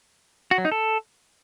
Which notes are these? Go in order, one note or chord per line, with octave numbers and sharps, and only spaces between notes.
F#4
F#3
D#4
A4